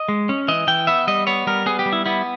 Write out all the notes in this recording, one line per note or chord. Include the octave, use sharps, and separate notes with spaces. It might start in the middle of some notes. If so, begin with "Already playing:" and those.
Already playing: D#5
G#3
C#4
E3 D#5
E3 G5
B3 E5
G3 D#5
B3 C#5
G3 A#4
B3 G#4
G4
G3
E4
B3 E4